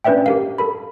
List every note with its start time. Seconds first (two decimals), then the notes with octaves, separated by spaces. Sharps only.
0.04 C#4 D4 B4 D5 E5 G5
0.26 G4 A#4 F5
0.58 A4 A#4 B5